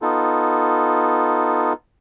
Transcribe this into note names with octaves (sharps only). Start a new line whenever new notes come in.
B3 D#4 F4 A4